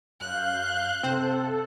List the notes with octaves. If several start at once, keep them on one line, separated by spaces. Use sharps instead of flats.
F#2 F5 F#6 G6
C3 C4 A4 C5